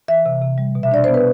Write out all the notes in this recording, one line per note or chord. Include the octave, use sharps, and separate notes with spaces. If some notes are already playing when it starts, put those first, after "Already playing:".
E3 E5
C3
C3
G3
B2
E5
D4 D5
B3 C5
B4